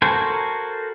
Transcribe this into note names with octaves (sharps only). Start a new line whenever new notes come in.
F#4 A4 A#4 C5 G#5